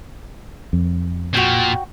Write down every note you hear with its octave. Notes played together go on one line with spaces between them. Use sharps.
F2
A#2 F#4 G5